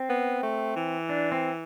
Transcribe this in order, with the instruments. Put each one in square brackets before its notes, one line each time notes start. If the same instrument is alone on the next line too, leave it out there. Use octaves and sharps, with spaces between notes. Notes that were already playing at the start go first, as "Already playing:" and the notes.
Already playing: [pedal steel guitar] C4
[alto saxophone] B3
A3
E3
[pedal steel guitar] D4
C4